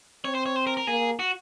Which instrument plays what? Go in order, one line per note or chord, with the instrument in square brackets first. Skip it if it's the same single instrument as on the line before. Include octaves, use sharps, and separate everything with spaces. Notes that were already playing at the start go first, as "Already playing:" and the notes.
[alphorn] C4 [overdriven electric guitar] C#5
[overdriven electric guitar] C5
C#5
C5
A#4
A#4
[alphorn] A#3 [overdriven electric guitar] G#4
[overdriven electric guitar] F#4